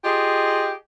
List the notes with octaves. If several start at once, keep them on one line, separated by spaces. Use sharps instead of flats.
F4 G4 G#4 D#5